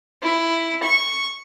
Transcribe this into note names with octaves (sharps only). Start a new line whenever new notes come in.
E4
C#6